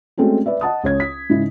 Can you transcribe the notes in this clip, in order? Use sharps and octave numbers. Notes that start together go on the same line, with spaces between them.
G#3 A3 C4 C#4 F#4
B4 D5 E5
D#5 F#5 A5 D#6
C#2 C#5 G#6
B6
G#2 C#3 E4